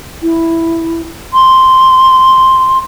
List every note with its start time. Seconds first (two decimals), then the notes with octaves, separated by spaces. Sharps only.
0.23 E4
1.34 C6